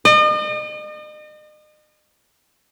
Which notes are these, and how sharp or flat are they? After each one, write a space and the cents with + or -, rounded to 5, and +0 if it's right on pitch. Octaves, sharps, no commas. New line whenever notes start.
D#5 -40